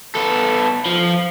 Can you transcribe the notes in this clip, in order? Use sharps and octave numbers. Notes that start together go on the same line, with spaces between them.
B3 A4
F3